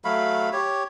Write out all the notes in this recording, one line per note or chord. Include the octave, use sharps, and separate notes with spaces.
F#3 A3 F5 B5
G4 C#5